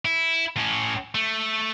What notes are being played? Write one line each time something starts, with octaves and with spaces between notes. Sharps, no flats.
E4
A2 C#4
A3